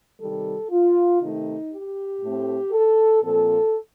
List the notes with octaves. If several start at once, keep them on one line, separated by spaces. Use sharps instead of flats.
C3 D#3 G3 A4
F4
C3 D#3 A3 D#4
G4
A2 A3 C4
A4
A#2 F3 C4 A4